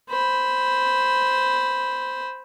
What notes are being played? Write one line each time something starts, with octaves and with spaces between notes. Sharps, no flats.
C5 B5